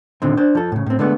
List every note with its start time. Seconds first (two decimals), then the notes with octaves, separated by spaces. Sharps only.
0.22 A#2 D3 D#3 C4
0.37 D4 C5
0.55 F3 A4
0.72 A2 C#3
0.86 A2 C4
0.99 D3 G#3 A3 B3